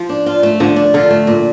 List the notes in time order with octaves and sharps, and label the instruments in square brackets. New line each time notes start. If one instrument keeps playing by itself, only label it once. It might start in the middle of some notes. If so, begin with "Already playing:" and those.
Already playing: [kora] F3
[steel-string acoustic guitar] D4
F4
A3
[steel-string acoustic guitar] D3 [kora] F3
[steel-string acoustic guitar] D4
[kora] D3 [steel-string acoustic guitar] F4
[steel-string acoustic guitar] A3
A#2